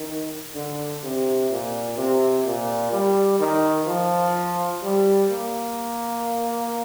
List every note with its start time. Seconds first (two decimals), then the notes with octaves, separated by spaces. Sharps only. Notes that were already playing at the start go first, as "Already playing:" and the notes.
Already playing: D#3
0.55 D3
1.03 C3
1.50 A#2
1.97 C3
2.45 A#2
2.92 G3
3.40 D#3
3.87 F3
4.83 G3
5.30 A#3